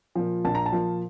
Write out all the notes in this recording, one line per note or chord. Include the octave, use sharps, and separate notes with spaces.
A#2 F3
A#1 A5
A#5
A5
A#2 F3